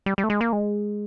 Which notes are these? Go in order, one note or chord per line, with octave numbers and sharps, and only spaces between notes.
G3
G3
A3
G#3
A#3
G#3